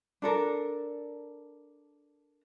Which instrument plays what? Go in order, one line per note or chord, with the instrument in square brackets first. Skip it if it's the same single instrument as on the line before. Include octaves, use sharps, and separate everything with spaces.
[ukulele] D4 A4 A#4